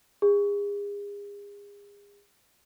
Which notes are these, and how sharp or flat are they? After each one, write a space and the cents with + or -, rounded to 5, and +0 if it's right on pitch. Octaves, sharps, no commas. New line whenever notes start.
G#4 -35